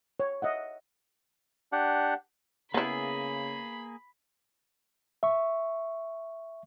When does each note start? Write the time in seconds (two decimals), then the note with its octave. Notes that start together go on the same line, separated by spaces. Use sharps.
0.20 C#5
0.42 D#5 E5 F#5
1.72 D4 G4 F#5
2.74 C#3 A#3 B3 E4 G#4 B5
5.23 E5 C#6